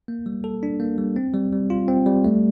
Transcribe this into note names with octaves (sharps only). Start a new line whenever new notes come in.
A#3
G3
A4
D4
A#3
G3
C4
G3
G3
F4
C4
G3
A3